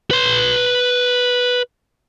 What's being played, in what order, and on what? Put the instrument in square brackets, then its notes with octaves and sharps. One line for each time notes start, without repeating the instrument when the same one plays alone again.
[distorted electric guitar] B4 C6